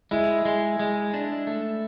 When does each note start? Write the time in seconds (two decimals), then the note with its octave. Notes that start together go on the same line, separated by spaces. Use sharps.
0.11 G#3 E4
0.45 G#3
0.79 G#3
1.14 D4
1.47 A3